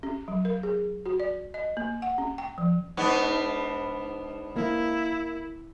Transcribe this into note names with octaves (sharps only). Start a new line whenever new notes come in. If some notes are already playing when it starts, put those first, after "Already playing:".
C#4
F#3
A#4
G#4
F#4
D5
D#5
A#3
F#5
C#4
G5
F3
G#2 B3 D4
A#3 E4